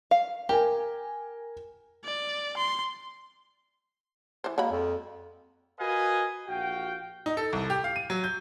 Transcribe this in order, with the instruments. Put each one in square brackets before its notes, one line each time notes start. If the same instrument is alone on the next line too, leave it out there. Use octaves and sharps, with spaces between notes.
[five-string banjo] F5
[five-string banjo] G4 [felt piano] A#4 G#5
[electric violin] D5
C6
[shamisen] E3 C5
[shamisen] F#3 G#3 B5 [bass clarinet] A#3
[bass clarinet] F2
[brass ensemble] F#4 A#4 B4 D#5 F5 G#5
A#1 F#4 F5 G5
[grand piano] D#4
A4
C2
G4
F5
D#7
F#3
G6